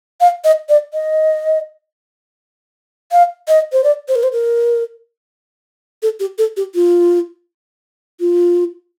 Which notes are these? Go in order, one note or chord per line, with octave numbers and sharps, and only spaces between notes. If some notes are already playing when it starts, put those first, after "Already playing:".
F5
D#5
D5
D#5
F5
D#5
C5
D5
C5
A#4
C5
A#4
A4
G4
A4
G4
F4
F4